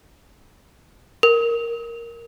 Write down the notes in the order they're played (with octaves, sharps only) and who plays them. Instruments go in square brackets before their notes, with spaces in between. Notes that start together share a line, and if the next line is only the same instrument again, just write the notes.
[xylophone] A#4